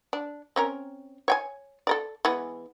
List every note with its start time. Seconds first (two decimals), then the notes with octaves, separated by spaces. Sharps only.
0.13 D4
0.56 C4 C#4 A#4
1.28 C#5 G5 G#5
1.87 A4 A#4 D5
2.25 E3 G#3 B3